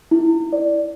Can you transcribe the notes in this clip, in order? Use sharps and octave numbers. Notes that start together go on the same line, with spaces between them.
E4
D5